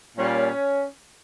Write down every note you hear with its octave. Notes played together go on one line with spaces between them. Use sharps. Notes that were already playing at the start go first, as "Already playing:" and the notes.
A#2 G3 C#4